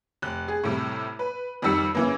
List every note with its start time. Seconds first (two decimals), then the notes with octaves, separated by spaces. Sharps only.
0.22 F1 F#6
0.48 G#4
0.63 A2 C3 G3
1.19 B4
1.62 F2 D#3 G3 E6 C#7
1.95 C#3 E3 A#3